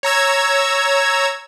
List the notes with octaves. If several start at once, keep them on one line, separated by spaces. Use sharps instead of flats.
C#5 A#5 E6 G#6